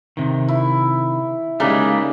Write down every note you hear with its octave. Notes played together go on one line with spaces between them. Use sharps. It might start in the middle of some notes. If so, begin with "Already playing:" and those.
C3 D#3
E4
C#3 G3 G#3 A#3 D#4